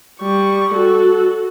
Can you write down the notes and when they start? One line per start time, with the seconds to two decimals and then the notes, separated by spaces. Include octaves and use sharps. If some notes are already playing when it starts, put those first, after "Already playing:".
0.19 G3 C#6
0.73 F#4 A4